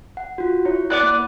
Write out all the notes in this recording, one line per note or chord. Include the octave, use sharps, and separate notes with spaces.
F#5
F4 F#4
E4 C#5
B3 D5 F#6
A#3